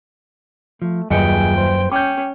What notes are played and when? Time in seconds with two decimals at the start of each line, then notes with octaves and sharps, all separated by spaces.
0.82 F3 A3
1.10 D#1 F#2 G#4 B4 D#5 G5 C#7
1.56 C5
1.92 C#4 G5 D6 G6